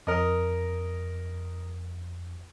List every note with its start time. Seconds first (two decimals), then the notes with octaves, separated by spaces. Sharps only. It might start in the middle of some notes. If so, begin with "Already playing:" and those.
0.07 F2 A#4 D#5